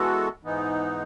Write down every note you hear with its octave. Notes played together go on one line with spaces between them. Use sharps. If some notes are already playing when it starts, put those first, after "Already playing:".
Already playing: E3 G#3 B3 F#4 A4
G#2 E3 B3 D#4